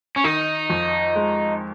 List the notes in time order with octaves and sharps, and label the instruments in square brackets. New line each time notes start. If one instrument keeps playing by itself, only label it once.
[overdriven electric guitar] C#4
[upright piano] D#3 [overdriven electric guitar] D#4
[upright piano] F2
G#3